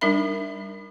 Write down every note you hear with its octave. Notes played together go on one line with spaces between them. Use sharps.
G3 D4 D#4 A#4 E5 B5